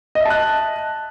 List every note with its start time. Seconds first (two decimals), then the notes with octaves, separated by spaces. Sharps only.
0.15 D#5
0.20 E5
0.25 A5
0.30 F#6